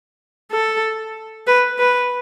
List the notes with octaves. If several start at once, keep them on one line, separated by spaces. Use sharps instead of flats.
A4
B4
B4